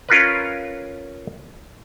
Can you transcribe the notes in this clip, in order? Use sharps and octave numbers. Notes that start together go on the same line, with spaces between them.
C#4 F4 A#4 B4